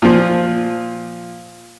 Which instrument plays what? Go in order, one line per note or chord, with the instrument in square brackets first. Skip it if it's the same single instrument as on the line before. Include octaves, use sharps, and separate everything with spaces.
[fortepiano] A#2 F3